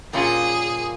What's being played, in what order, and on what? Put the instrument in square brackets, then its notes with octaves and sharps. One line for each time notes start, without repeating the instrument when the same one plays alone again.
[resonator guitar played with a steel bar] A#2 G3 A#3 C#4 F4 [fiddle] G#4